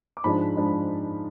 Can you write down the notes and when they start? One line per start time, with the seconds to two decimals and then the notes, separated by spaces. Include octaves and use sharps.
0.17 D6
0.24 G#2 F3 G#3 D4 B5
0.57 F3 G#3 D4